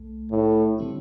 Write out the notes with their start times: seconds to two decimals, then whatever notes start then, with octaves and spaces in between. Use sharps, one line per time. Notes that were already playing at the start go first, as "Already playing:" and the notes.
Already playing: C2 A3
0.31 A2
0.78 D3 G3 C4 E4